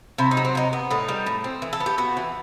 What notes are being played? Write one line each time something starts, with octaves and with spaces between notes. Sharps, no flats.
C3 E4
D#4
F#3
C4
C3 D#4
B3
A2 D#4
G3
A2
C4
E3
A4
B3
G4
B3 F#4
E3